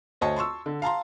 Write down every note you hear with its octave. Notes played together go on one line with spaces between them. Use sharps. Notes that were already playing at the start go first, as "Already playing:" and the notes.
D2 C5 C#5 D#5 A5
A5 C6 C#6 E6
D3
F5 A5 A#5 C6